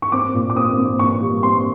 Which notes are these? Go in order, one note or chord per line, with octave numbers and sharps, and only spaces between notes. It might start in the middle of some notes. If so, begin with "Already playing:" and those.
C#6
C4 D6
A#2
D6
C4 D#6
C4
A#2 C#6
G3
C4 C6